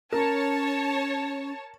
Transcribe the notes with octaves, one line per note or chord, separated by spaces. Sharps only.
C#4 A#4 C#5 A5